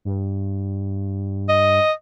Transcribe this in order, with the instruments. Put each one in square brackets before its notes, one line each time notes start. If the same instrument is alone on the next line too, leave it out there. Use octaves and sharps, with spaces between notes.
[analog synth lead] G2
[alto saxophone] D#5